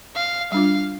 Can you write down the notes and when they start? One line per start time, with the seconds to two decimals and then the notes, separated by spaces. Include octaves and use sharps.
0.16 F5
0.52 G3 D4 F4 F5